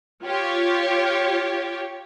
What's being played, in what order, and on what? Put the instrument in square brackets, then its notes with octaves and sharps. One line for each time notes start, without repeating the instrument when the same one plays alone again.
[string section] F4 G4 C#5